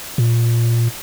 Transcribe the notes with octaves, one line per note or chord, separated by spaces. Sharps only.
A#2